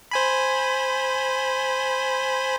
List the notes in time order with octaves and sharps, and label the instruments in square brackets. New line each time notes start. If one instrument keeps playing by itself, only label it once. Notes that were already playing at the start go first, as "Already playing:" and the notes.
[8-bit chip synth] C5 G#5 B5